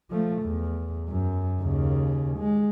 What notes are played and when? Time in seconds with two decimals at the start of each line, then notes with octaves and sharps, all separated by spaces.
0.10 F3 A3
0.43 E2
1.09 F#2
1.62 D#2 C#3
2.38 G#3